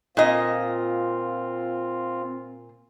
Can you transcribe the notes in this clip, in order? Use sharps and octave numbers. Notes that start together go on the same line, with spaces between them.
A#2 C4 F4 D#5